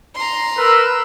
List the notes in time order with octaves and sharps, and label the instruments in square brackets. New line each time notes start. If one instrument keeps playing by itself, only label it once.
[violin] A#5 C6
[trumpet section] A#4 B4 [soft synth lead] E6